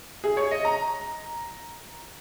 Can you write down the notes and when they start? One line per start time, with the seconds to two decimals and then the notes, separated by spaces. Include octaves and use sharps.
0.24 G#4
0.37 C#5
0.51 D#5
0.65 A#5